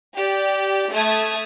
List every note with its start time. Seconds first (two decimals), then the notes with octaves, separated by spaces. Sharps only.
0.16 G4 D5
0.92 A3 A5 D#6 G#6